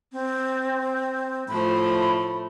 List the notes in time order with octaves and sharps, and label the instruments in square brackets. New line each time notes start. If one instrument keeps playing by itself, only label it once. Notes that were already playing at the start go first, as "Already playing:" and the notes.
[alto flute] C4
[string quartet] A2 F3 A3 [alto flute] B5